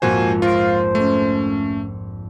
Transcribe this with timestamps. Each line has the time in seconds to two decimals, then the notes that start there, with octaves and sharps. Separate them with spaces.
0.02 A#1 F2 G#2 A#3 F#4 C5 G#5
0.42 F4 C5 F5 C#6 A#6 D7
0.95 A3 C#4